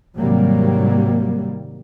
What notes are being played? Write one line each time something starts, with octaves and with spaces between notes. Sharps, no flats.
G#2 C3 D#3 F#3 G3 A#3